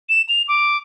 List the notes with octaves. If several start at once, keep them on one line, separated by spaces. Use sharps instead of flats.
E7
F7
D6